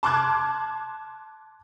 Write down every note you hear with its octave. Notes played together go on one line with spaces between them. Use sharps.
A5 C6 D6 F6 F#6 G#6